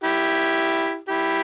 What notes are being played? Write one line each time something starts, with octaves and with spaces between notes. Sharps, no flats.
E4 G4
E4 G4